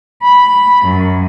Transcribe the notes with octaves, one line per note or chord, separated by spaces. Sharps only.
B5
F#2